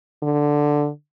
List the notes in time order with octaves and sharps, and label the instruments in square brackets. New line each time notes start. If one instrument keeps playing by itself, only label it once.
[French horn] D3